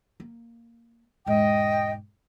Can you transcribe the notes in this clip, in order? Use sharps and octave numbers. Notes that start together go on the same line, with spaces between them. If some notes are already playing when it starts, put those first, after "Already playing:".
A#3
E1 G#2 D#5 G5